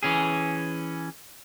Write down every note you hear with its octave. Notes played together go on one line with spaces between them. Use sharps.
E3 C#4 G#4